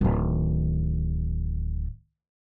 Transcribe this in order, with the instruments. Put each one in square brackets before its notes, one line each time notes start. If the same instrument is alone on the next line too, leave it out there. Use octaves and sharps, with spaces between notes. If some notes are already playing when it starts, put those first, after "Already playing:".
[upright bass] D1 D#3